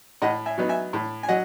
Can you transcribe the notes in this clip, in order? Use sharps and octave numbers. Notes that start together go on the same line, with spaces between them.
A2 D#5 F#5
E5 G#5
F#3 B3 D#4
E5 G#5
A2
G#5
F#3 D#5 F#5